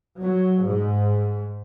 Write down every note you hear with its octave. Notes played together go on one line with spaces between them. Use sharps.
F#3
G#2